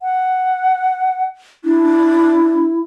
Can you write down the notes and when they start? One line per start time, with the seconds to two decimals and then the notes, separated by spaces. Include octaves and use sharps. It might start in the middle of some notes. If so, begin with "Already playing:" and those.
0.02 F#5
1.64 D4 E4